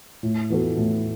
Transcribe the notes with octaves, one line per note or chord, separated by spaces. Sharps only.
A2
E3 B3 F#4 A4
A2